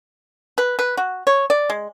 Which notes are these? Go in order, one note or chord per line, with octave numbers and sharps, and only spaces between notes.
B4
B4
F#4
C#5
D5
G#3